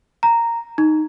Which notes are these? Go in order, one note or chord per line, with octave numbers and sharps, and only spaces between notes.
A#5
D#4